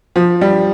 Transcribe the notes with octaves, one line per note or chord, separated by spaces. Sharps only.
F3
G3